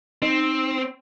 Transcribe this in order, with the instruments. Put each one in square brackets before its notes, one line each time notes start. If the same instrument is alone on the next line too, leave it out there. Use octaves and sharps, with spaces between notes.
[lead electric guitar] C4 [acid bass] D#4